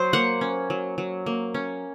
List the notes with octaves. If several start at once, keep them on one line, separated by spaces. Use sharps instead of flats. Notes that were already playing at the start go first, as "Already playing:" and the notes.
Already playing: F#3 C5
A#3 F#5
C#4
F#3
F#3
A#3
C#4